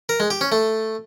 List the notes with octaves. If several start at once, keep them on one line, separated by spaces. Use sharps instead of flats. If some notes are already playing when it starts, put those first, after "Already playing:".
A#4
G#3
G4
C#4
A3